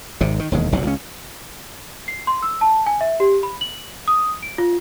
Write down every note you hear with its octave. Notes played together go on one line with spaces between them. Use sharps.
G#1 G#2 C3
D#3
E1 D#2 G#3
F1 B1 C3
C#2 C#4
C7
C6
E6
A5
G#5
E5
G4
B5
F#7
D#6
D7
F4